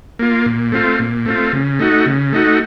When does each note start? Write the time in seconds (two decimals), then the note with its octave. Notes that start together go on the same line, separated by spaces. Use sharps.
0.19 A#3 F4
0.46 A#2
0.72 A3 C4 F4
0.99 A#2
1.26 A3 C4 F4
1.52 C#3
1.79 A3 D#4 F#4
2.06 C#3
2.33 A3 D#4 F#4